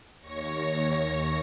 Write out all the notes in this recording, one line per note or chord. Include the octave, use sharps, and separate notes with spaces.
D#2 C#5 C#6 A#6